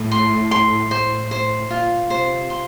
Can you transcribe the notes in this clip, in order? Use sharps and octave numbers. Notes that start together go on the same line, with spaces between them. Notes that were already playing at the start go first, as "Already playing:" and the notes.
Already playing: A2
C6
C6
A2 C5
C5
A#2 F4
C3 C5
C6